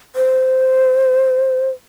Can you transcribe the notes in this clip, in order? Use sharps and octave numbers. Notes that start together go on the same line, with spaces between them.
C5